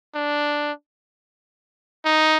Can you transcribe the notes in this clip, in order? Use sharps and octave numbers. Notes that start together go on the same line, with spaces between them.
D4
D#4